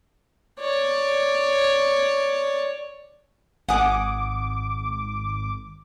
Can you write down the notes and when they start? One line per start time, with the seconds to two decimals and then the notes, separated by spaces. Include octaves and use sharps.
0.60 C#5 D5
3.69 G#1 F#5 G#5 D6 D#6